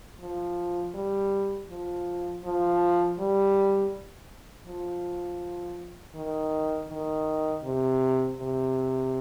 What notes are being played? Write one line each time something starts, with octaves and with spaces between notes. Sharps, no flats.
F3
G3
F3
F3
G3
F3
D#3
D#3
C3
C3